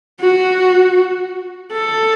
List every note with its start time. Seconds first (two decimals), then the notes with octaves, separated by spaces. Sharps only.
0.21 F#4
1.72 A4